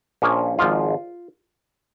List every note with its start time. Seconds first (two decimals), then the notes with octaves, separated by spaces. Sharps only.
0.22 A#1 A#2 F3 A#3 C#4
0.59 G#1 G#2 F3 F4